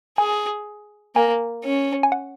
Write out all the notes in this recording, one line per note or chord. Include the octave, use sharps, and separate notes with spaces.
G#4 G#5
A#3 G#5
C#4
G#5
F#5